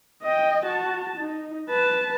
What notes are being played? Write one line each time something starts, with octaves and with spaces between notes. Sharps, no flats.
D#5 G5
F#4 A5
D#4
B4 A5